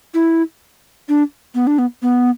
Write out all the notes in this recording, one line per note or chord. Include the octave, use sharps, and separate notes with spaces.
E4
D4
B3
D4
B3
B3